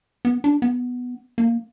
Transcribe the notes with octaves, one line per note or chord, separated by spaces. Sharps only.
B3
D4
B3
A#3